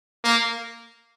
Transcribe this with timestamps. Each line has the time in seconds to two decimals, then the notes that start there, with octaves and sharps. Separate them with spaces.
0.24 A#3